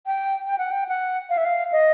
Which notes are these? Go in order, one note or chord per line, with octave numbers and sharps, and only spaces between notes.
G5
G5
F#5
G5
F#5
F5
E5
F5
D#5